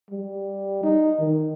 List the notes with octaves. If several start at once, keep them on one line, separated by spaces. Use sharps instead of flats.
G3
D#4
D#3